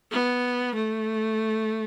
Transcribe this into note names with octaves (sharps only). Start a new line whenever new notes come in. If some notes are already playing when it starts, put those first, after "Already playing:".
B3
A3